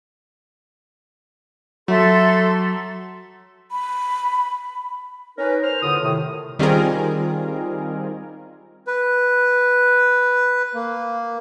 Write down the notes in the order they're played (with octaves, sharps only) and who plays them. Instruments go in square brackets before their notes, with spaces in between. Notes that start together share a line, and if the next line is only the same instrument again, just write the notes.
[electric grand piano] F#3 [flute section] A4 E5 C6
[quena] B5
[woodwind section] C#4 D#4 A#4 B4
C5 F6
E2 A2 D3 F4 D#6
A2 C3 D#3
[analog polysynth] D#3 G3 C4 F4 G#4 A#4
[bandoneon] B4
A#3